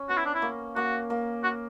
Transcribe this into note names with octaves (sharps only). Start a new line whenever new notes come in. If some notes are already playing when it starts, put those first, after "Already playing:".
Already playing: C#4
B3 F#4
E4
D4
E4
A#3
A#3 F#4
A#3
F#4